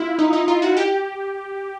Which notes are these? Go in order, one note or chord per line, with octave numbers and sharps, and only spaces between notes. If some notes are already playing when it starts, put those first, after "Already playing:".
Already playing: E4 F4
D#4
D#4
F4
F#4
G4